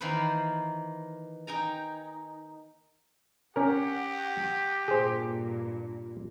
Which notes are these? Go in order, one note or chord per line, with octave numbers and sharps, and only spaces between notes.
D#3 E3 A#3 B4 C5
D#4 G5 G#5 A#5
C#4 G4 A#4 F#5
G2 A#2 G#4 C5